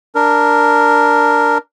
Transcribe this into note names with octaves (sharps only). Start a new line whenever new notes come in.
D4 A#4